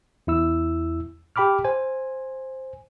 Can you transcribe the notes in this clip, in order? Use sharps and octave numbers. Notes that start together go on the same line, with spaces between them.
E2 E4 E6
G4 G5 B5 D6 F6
C5 G#5